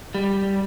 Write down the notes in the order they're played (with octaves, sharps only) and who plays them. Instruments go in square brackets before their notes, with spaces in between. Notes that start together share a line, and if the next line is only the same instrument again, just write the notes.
[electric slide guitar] G3